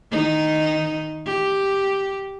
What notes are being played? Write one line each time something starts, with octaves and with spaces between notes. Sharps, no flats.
D#3 D#4
G4